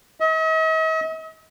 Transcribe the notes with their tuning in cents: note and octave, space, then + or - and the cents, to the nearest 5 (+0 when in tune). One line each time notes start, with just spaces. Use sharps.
D#5 +45